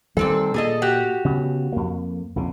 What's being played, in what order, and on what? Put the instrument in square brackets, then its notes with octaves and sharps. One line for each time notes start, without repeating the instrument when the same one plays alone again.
[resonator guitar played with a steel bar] A#2 C4 A4 [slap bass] D#3 G3 A3
[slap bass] A#2 [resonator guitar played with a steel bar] G#4 A4 D#5
[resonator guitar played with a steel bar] F#4 G4
[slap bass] C#3 B3
F2 A#3
A#1 F2 C#3